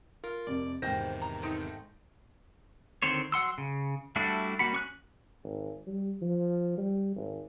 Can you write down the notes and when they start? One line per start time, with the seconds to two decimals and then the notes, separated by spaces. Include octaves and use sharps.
0.24 F4 A#4
0.47 F1 F2 D5
0.82 E2 G#2 C3 D#3 C5 G5 A#6
1.22 A#5
1.42 A3 C4 D#4
3.02 D3 D#3 C4 C5 C#5
3.32 F#3 F#5 C6 E6
3.58 C#3
4.16 G3 A3 D4 E4 F#4
4.59 G3 A#3 F#4 F#5 B5
4.73 C#4 C#6 F#6
5.44 G#1
5.87 G3
6.22 F3
6.78 G3
7.16 G#1